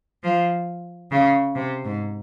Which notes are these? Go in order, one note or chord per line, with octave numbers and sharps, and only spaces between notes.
F3
C#3
C3
G#2